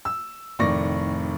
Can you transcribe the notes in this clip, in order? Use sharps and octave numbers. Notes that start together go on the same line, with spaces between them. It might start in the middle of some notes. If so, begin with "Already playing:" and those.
E6
F1 A2 D#3 D5 C#6 A#6